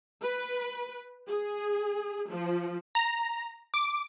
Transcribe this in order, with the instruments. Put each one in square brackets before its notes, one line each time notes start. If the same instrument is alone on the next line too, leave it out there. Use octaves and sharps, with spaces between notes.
[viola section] B4
G#4
F3
[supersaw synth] A#5
D6